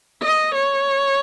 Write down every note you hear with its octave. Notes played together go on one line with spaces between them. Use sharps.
D#5
C#5